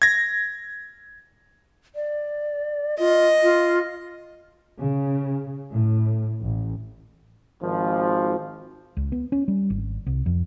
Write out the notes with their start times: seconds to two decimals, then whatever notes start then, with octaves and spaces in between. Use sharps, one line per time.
0.02 G#6 A#6
1.95 D5
2.99 F4 D#5
3.43 F4
4.80 C#3
5.72 A2
6.42 A1
7.62 G#1 F3
8.97 C#2
9.12 B3
9.32 C#4
9.48 G3
9.70 G#1
10.06 C2
10.26 F2